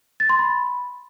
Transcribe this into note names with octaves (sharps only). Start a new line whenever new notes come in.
A6
C6
B5